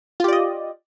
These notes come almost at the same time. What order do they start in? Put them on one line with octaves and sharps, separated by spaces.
F4 G4 D5 D#5